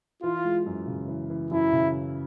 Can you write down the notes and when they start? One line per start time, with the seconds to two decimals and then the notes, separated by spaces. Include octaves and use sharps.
0.23 E3 F4
0.45 G#3
0.66 F#2
0.87 C#3
1.08 E3
1.30 E3
1.51 F#2 E4
1.73 C#3